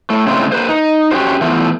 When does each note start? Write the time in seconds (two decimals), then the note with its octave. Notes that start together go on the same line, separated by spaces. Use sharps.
0.10 A2 A3
0.27 A2 C#3 G#3 A3 C4
0.52 A#3 B4 C5
0.69 D#4
1.11 C#4 F#4 G4 C5
1.41 E3 F3 A3 B3